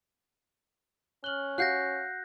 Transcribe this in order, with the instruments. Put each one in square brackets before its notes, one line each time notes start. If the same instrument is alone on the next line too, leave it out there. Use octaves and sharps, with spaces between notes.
[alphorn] C#4 [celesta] F6 F#7 G7 [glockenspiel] F#6
[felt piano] F#4 F5 [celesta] F#5 C7 C#7 [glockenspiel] F#6 G6 A#6